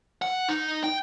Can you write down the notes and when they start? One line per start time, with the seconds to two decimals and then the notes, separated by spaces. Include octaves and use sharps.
0.22 F#5
0.49 D#4
0.84 G5